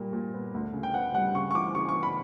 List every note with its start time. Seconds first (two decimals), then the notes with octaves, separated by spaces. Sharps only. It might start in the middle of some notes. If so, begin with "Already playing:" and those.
Already playing: A#2 G3 A#3
0.13 A#2
0.34 B3
0.54 D2
0.73 C#3
0.83 G5
0.94 B3 F#5
1.14 G3 F#5
1.35 C#3 C#6
1.51 C#6
1.54 E3 D6
1.75 C#3 C#6
1.89 C#6
1.95 B3
2.03 B5